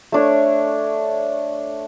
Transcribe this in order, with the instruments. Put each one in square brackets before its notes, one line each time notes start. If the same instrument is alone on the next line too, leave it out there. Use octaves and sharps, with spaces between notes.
[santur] A3 D4 C#5